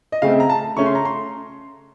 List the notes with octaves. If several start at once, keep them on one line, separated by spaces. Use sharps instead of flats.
D#5
C#3 A3 C4 F5
A#5
A5
C#3 A3 C#4 C#6
C6
A#5
C6